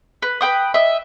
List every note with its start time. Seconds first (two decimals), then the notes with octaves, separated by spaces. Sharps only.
0.22 B4
0.41 B4 C5 G5 D#6
0.74 D#5 E5